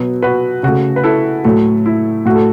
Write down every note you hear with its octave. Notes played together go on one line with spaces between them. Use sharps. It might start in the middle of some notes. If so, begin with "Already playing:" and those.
Already playing: B2 F#3 B3
F#4 B4
C#3 A3 F#4
B4
E4 A4
A2 F#3 A3
E4
A2 A3 F#4
A4